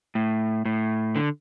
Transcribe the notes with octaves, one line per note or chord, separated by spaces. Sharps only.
A2
A2
D3